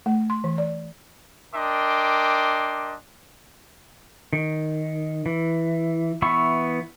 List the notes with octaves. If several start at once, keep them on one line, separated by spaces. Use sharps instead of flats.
A3
C6
E3
D5
D4 A#4 D#5 G5 C6 D6
D#3
E3
E3 B3 E5 B5 C#6